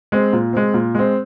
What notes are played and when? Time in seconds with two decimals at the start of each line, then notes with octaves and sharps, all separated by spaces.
0.12 G#3 C4
0.33 A#2
0.53 G#3 C4
0.74 A#2
0.95 G#3 C4